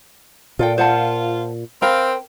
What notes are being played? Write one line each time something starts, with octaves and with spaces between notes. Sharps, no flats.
A#2 F4 A4 G5
F4 C5 F#5 A5
C4 A#4 F5 G5 B5